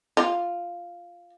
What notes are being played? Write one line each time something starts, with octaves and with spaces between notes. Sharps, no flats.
F4